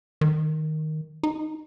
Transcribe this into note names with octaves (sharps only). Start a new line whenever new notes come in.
D#3
D#4